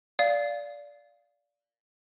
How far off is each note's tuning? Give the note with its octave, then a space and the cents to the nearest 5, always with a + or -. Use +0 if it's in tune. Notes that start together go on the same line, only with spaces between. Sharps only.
D5 -15 F5 +0